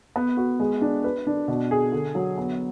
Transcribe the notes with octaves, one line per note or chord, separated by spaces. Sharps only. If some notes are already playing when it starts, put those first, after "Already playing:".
B3
F#4
G#3
D4
B4
D4
B2
G#4
D3
F#3
B3